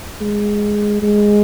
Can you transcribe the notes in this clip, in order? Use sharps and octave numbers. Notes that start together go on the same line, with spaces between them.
G#3
G#3